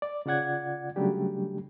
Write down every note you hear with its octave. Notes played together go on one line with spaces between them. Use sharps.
D5
C#3 F4 D5 F#5 G#6
C#3 F#3 G3 A3 D4 G4